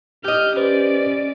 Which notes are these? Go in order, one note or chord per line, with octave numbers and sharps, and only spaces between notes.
G4 D#5 F6 G6
C#4 B4 C5 D5